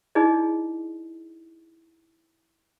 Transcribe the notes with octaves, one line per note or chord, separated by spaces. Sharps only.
D#4 E4 G#4 D5 D#5